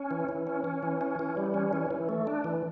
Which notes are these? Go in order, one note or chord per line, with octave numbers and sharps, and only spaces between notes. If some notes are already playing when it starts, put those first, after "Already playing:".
Already playing: C#4
E3
E3
C#4
C#4
E3
C#4
E3
G3
C#4
E3
E3
A3
D4
E3